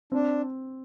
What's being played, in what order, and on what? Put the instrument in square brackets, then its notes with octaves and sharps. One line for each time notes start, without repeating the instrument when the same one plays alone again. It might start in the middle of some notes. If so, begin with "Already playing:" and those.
[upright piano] C4 [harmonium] D4